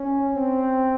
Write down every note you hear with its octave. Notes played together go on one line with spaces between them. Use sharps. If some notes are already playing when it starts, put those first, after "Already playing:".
Already playing: C#4
C4